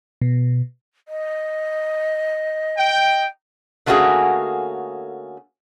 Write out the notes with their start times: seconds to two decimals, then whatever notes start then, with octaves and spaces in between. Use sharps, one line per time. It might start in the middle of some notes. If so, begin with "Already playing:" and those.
0.22 B2
1.08 D#5
2.78 G5
3.86 D3 A3 A#3 C#4 F#4 G#4